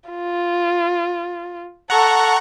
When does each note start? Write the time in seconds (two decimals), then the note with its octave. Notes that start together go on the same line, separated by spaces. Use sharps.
0.10 F4
1.90 A4 F#5 A#5 C#6